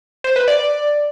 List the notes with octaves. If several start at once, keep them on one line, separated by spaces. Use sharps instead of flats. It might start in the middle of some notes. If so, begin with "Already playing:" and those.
C5
B4
D5